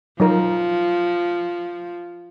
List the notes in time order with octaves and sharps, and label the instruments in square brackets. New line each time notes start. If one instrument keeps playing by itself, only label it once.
[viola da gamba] F3 [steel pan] F#3 D#4 A#4